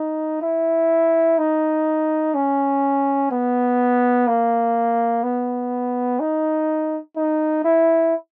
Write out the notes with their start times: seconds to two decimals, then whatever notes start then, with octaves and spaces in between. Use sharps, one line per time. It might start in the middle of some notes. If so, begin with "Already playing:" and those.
Already playing: D#4
0.42 E4
1.38 D#4
2.34 C#4
3.31 B3
4.27 A#3
5.23 B3
6.20 D#4
7.16 D#4
7.64 E4